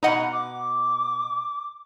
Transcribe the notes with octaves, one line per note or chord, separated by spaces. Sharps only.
B2 D#4 D#5 F#5 A#5
D6